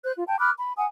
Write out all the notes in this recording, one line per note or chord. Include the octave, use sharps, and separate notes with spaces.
C5 F#6
F4
G5 A5
B5 D6 F6 F#6
B5
F#5 G#5 D#6